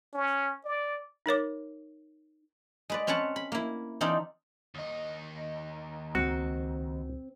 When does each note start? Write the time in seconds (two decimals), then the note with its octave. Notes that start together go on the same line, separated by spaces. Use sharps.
0.13 C#4
0.65 D5
1.26 D#4 A#4 C#5 D6
2.90 G#3 B4 D5
3.07 C4 C#4 B4 C#5 F#5 A5
3.36 B5
3.52 A#3 E4
4.01 E3 C4 D#4 F4 A4 D5
4.75 D#2 D#4
6.15 C#2 C4 F#4